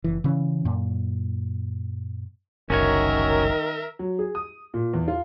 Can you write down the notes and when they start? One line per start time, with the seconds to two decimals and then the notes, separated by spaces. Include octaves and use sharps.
0.04 F#1 E3
0.24 C#3 E3 C#4
0.65 F#2 A#2
2.70 F#1 C2 D#3 C#4 F#4 A#4 C#5 E5
3.99 F#3
4.19 G#4
4.35 D#6
4.74 A#2
4.94 E2
5.08 F4